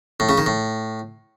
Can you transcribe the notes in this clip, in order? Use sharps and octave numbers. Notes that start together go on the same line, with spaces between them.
A2
C#3
D#3
A2